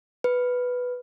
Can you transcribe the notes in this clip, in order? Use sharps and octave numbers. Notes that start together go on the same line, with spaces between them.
B4